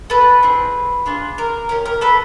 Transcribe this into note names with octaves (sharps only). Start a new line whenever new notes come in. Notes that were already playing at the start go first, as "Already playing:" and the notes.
A4 B4
C4 E4 G#4
D4 F4 G#4
A#4
C#4 E4 G4 A#4
A#4
A4 B4